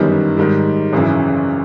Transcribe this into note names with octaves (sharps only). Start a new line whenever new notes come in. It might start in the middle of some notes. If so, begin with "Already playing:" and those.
Already playing: G1 F#2 D#3 G3 B3
G#2 D#3 G3
G#1 F#2 C#3 E3